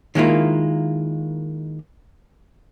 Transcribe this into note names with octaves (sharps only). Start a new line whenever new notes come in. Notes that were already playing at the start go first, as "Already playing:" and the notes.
D#3 G#3 A#3 E4 F4